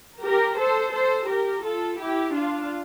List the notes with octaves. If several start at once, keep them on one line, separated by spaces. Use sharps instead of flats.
G4 A#4
A4 C5
A4 C5
G4 A#4
F4 A4
E4 G4
D4 F4